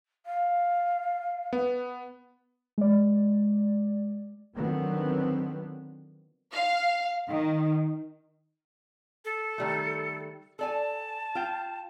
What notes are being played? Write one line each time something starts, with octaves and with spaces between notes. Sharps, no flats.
F5
B3
G#3 D5
D3 D#3 F3 F#3 B3 C4
F5
D#3
A4
D#3 G3 A3
A4 D5 G#5 A5
F4 F5 G5